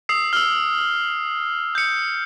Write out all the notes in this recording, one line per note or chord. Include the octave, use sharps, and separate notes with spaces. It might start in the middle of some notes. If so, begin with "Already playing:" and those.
D#6 E6 C7
E6 F6
G6 C#7